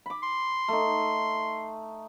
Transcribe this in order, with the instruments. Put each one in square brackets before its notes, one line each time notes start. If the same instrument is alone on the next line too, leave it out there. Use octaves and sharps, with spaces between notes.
[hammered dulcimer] B5 D6
[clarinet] C6
[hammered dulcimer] A3 D#4